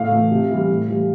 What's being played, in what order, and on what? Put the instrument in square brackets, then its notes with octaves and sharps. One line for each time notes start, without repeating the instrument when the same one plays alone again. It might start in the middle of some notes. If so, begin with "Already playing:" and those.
Already playing: [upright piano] A2 F5
E3 A3
C3
E3 G3
A2
E3 G3